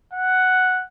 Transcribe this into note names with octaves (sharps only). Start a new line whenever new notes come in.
F#5